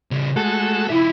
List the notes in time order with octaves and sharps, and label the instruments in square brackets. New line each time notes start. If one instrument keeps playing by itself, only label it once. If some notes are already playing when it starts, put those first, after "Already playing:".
[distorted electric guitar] C#3 G3
[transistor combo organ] G#3 A3 F#4 [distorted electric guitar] A4
[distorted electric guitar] F3 E5 [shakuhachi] E4